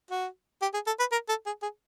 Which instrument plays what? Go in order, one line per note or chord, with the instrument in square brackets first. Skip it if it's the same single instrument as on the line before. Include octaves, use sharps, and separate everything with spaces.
[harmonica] F#4
G4
G#4
A4
B4
A#4
A4
G#4
G#4